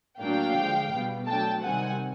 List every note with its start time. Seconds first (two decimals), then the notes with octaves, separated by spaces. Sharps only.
0.21 A2 F#3 A#3 D4 F5 G5
0.57 D3 F3 G#3
0.93 B2 G3 B3
1.28 F#3 A3 D4 G5 A5
1.64 C3 D#3 G3 C4 F#5 G#5